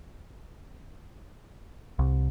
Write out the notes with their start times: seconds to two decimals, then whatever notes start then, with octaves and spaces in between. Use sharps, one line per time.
1.99 C2